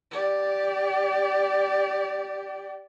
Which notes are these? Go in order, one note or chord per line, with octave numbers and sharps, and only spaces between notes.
G4 D5